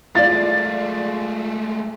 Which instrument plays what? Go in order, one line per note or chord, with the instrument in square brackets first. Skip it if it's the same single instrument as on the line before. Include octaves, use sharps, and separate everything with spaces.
[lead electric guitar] G#3 A3 [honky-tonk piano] F4 D5 [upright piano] A6